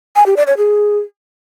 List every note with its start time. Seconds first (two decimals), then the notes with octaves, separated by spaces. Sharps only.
0.16 G#5
0.26 G4
0.37 D5
0.47 C#5
0.57 G#4